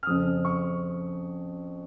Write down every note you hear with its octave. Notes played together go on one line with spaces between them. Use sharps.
F6
F2 C#3 F3 D#6
C#6